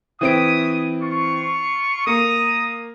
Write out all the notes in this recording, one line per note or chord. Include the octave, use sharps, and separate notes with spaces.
E3 C4 C#5 E5 D#6 D7
F4 C#6
A#3 A#5 D#6